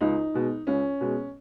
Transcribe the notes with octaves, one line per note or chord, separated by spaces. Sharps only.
C#2 D#4
B2 G#3
C#2 C#4
B2 G#3